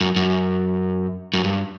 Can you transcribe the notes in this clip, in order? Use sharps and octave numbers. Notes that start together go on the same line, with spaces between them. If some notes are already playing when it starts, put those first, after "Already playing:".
F#2
F#2
F#2
G2